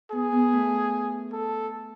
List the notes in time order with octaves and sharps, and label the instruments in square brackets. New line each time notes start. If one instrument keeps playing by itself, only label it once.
[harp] B3 [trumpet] G#4
[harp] B3
A3
[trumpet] A4